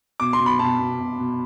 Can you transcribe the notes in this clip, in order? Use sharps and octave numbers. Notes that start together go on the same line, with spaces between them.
B2 D6
C6
B2
B5
B2 A5
B2
B2
B2